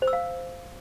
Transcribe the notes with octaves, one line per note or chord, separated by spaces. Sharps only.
C5
E6
F5